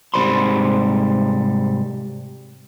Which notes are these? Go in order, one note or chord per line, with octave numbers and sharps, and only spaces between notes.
G#2 C3 G3 C5 B5 C6